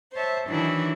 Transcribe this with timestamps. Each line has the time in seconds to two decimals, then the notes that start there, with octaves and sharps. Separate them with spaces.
0.13 C5 C#5 E5 A5
0.46 D#3 E3 F#3 D4 E4